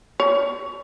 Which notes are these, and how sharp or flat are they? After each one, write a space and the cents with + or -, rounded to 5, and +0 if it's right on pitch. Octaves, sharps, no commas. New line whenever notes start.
C#5 +30